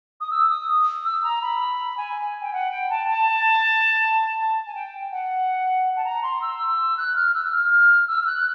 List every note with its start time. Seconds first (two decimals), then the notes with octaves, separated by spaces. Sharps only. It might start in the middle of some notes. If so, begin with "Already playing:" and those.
0.21 D#6
0.31 E6
0.49 D#6
1.05 E6
1.24 A#5
1.42 B5
1.97 G#5
2.42 G5
2.53 F#5
2.71 G5
2.90 A5
3.08 A5
4.67 G#5
4.75 G5
5.12 F#5
5.96 A5
6.05 A#5
6.23 C6
6.42 E6
6.97 F#6
7.16 F6
7.34 E6
7.52 F6
8.08 E6
8.21 F6
8.26 F#6